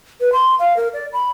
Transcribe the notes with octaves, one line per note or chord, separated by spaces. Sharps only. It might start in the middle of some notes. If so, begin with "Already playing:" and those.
B4
C6
F5
A#4
D5
B5